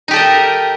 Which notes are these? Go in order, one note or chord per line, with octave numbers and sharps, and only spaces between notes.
D#4 G4 A4 A#4 D#5